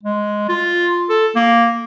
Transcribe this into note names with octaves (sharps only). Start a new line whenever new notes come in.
G#3
F4
A4
A#3